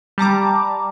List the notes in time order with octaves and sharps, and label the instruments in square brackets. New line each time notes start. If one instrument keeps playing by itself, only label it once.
[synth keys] G3 A5 A#5 D6